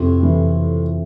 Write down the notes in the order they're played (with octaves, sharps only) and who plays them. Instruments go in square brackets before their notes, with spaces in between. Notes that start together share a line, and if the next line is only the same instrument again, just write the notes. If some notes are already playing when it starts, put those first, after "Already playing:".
Already playing: [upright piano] F2 [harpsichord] A2 C3
[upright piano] E3